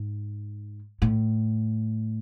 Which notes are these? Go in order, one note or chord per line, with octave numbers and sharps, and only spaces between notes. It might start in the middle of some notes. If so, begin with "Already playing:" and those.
Already playing: G#2
A2